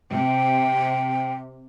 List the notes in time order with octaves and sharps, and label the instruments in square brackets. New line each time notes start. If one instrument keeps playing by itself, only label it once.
[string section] C3 [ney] G5